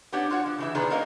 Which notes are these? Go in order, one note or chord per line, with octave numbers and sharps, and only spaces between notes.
B3 C#4 D4 G4 C#5 F#5
F4 F#4 C#5 F#5
F3
C#3 E3 E5
A#2 D#3 D4 G#4 B4
A#3 B3 C#4 A#4 D#5 F5